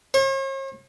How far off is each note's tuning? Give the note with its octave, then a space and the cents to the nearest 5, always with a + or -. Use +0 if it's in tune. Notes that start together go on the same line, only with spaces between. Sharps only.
C#5 -45